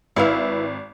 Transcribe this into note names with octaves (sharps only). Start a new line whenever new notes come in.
G#1 E4 B4 F5